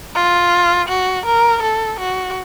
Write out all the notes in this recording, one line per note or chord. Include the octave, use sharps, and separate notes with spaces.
F4
F#4
A#4
A4
F#4